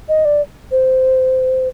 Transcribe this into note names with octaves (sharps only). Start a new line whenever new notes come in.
D#5
D5
C5